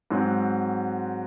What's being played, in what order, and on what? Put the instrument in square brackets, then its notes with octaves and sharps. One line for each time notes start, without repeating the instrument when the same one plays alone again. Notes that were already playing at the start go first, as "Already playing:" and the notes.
[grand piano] G#2 F#3 C4 F#4